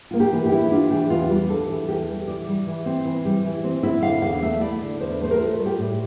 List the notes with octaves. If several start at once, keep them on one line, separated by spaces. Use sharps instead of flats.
A#3 F4
G4
E3
G4
E4
D4 F4
E3 G4
E2 F4
G3
D4 A4
E3
E2 G4
G3
E3 D5
G3
E3
C4
E3
G3
E3
C4
E4 E5
D3 F5
E2 F5
A3 E5
E4 D5
D3
E2 C5
A3 C5
A#4
F4 A4
G3
G4
A2